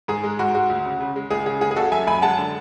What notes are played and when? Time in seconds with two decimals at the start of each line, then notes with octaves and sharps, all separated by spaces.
0.08 G#2 G#4
0.23 G#3
0.39 G#2 F#4
0.54 G#3 F#4
0.70 D2
0.85 C#3
1.01 C#3
1.16 G#3
1.31 C#2 G#4
1.45 C#3 G#4
1.61 C#2 G#4
1.71 G#4
1.76 C#2 F#4 A4
1.92 F#2 E5 G#5
2.07 F#2 G#5 B5
2.22 G#3 F#5 A5
2.38 D3